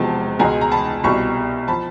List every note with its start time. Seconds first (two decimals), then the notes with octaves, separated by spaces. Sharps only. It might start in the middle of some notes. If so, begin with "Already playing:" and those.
Already playing: E1 E2 C3 F3 G#3 A5
0.39 C#2 B2 G#3 G#5 A#5
0.61 A#5
0.72 A5 B5
1.03 C2 B2 G3 B5 C#6
1.68 F3 A5 B5